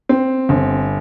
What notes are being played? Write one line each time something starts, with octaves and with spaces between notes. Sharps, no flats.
C4
G1